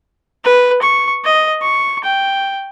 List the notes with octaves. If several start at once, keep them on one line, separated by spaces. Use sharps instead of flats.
B4
C#6
D#5
C#6
G5